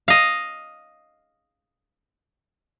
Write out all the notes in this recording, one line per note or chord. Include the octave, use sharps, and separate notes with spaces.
D#5 F5